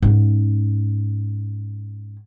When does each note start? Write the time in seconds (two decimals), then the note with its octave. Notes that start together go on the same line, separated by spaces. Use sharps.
0.02 G#2 C#4